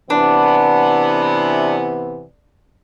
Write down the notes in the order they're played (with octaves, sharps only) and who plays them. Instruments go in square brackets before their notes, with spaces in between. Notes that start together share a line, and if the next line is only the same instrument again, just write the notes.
[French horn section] C3 E3 B3 [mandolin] D4